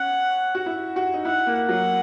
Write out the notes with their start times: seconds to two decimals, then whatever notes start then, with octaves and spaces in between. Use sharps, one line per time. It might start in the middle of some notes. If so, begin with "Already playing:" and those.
Already playing: C#4 F#5
0.55 F#4
0.66 E4
0.96 F#4
1.14 D#4
1.25 E4 F#5
1.47 A#3
1.69 F#3 F#5